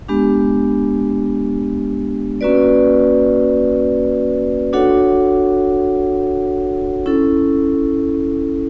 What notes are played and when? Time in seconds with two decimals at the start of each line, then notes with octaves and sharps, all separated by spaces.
0.09 G#3 B3 D4 G4
2.41 A#3 C#4 F#4 B4 D5
4.73 D4 F#4 A4 C#5 F#5
7.06 C#4 E4 A4